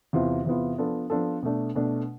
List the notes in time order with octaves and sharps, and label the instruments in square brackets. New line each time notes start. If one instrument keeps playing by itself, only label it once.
[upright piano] E2 C3 E3 B3 F4
E2 C3 E3 B3 F4
F3 B3 D4 F4 A4
F3 B3 D4 F4 A4
B2 A3 D4
B2 A3 D4